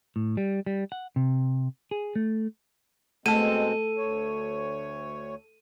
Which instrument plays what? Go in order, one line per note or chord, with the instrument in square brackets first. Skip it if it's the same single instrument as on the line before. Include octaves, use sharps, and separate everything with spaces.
[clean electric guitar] A2
G3
G3
F#5
C3
G#4
A3
[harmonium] B2 G#3 C4 [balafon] A3 A5 [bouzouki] A4 [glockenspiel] D#7
[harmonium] D2 C#5